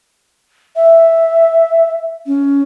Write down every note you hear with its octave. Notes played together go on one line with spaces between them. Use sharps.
E5
C#4